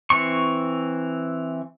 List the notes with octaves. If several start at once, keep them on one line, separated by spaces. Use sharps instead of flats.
E3 C4 C#6